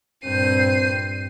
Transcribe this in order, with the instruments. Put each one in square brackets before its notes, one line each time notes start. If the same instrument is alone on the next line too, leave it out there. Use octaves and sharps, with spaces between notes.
[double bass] G2 A#2 [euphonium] C4 [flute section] G6 [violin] C7 D#7